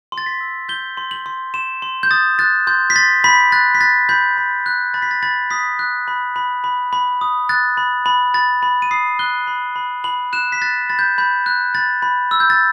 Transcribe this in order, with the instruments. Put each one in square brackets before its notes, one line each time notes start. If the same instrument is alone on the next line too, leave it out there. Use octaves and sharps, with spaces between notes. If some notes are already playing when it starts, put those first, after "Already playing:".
[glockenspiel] C6
A6
B6
E6
G6 G7
C6
F#7
C6
C6 E7
C6
G6
D#6 A6
F#6 A6
C6 G6
B6
C6 A6
B5 B6
F#6 A6
B6
F#6 A6
B5 G6
B5
F#6
B5 A6
B6
A6
B5 A6
D#6 B6
F#6
B5
B5
B5
B5
D#6
F#6 A6
B5
B5
B5 A6
B5
D#7
D#6 C7
F#6 G7
B5
B5
B5 F#7
F#6 E7
B6
F#6 A6
B5 A6
G6
B5 G6
F#6
B5 A6
B5
E6
G6
A6